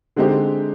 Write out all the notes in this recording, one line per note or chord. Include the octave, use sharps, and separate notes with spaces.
D3 G#3 C4 D#4 G4